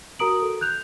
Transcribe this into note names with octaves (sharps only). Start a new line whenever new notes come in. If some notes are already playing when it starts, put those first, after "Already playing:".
F#4 A#4 A#5 D#6 D7 F#7
A4
F#6 G6 F7